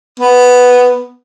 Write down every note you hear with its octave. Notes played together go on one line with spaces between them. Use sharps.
B3